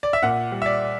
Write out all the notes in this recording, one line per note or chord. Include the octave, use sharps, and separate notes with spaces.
D5
E5
A#2 F#5
G3
E5
D5